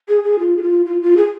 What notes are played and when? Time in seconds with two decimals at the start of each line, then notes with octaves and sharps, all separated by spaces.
0.08 G#4
0.23 G#4
0.39 F4
0.57 G#4
0.62 F4
0.86 F4
1.02 F4
1.17 G#4